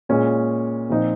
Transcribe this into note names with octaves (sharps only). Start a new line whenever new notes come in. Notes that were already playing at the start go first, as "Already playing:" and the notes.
A#2 G#3 C#4
A#2 F3 C4 D#4